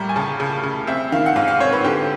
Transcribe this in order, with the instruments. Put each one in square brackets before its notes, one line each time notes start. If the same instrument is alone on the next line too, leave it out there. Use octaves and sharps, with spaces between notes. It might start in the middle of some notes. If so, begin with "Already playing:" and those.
Already playing: [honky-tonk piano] A2 G3 A#3 [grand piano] A#5
[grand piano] G#5
[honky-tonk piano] C#3 [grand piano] A5
[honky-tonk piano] C#3
C#3
[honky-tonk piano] C4 [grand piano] E5
[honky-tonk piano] D#3 [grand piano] F5
[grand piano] F#5
[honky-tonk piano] G#2 [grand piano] F5
[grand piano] F5
[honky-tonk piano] C4 [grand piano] C#5
[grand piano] B4
[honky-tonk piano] D3 [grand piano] G4